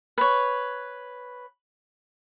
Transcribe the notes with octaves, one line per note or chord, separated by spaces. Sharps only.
B4 C#5